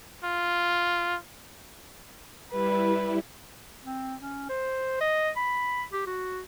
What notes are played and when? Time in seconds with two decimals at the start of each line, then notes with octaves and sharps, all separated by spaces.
0.24 F4
2.51 G3 E4 B4
3.84 C4
4.21 C#4
4.49 C5
5.01 D#5
5.36 B5
5.92 G4
6.07 F#4